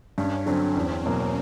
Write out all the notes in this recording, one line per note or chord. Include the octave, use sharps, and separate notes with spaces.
G2 C#4
D3 F#3 C4
E2
B2 F#3 A#3